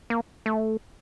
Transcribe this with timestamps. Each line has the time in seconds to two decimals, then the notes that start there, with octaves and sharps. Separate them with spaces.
0.10 A#3
0.46 A3